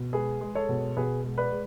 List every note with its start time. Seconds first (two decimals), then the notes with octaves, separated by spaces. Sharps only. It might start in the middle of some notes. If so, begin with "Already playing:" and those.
Already playing: B2
0.13 G#3 G#4 B4
0.41 G#3
0.55 A4 C#5
0.69 B2
0.96 B2 G#4 B4
1.24 G#3
1.38 B4 D5
1.51 G#3